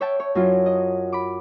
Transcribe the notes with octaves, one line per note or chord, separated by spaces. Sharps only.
C#5 E5 G5 A5
C#5
F#2 F#3 E4 F4
D#5
B5 D6